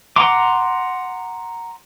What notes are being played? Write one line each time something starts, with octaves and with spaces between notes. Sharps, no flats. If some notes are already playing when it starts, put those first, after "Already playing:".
F#5 A#5 C6 D6